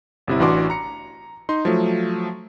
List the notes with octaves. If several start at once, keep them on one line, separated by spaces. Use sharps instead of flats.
G1 C3 E4
A1 E3 D4 F#4 C6 D6
A#5 C#7
D#4 C6
F3 F#3 A3